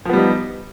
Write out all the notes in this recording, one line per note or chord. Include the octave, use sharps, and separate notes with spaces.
F3 G3 B3 D#4